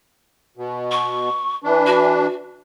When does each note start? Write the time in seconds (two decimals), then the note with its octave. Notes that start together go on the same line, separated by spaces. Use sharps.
0.57 B2
0.91 C#6
1.64 E3 D4 B4
1.86 F#4